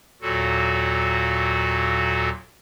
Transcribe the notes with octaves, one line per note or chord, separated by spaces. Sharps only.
D#2 A#2 F#3 F#4 A4